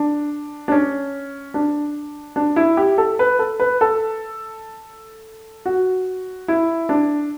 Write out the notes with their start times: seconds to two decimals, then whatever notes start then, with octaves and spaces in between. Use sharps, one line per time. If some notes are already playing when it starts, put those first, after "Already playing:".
Already playing: D4
0.68 D4
0.72 C#4
1.54 D4
2.36 D4
2.56 E4
2.77 G4
2.98 A4
3.19 B4
3.39 A4
3.60 B4
3.81 A4
5.66 F#4
6.48 E4
6.89 D4